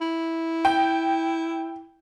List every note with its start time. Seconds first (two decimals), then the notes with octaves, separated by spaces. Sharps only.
0.01 E4
0.65 G5